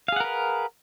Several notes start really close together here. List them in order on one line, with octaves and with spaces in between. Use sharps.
F5 G#4 F#5 A#4 B4